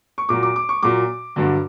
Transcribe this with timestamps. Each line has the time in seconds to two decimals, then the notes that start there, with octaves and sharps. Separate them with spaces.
0.18 C#6
0.29 A#2 F#3 D6
0.43 D6
0.56 D6
0.69 C#6
0.83 A#2 F#3 D6
1.36 G2 D3 F#3